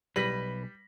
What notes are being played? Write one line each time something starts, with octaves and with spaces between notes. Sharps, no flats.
B1 G3 B4 A#6 B6 F#7